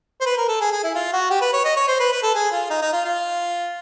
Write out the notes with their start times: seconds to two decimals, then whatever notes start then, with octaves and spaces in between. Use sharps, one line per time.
0.21 C5
0.26 B4
0.37 A#4
0.48 A4
0.61 G#4
0.71 G#4
0.84 E4
0.95 F4
1.13 F#4
1.30 G4
1.41 B4
1.53 C#5
1.64 D#5
1.76 C#5
1.88 C5
2.00 B4
2.12 B4
2.23 A4
2.35 G#4
2.52 F4
2.70 D#4
2.82 D#4
2.93 F4
3.05 F4